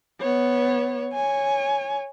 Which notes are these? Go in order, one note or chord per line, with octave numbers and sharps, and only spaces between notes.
B3 C#5
C#5 G#5